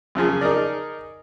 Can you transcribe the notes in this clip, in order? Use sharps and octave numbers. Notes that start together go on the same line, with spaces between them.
F#2 C#3 F3 G#4
D#4 G#4 A#4 D5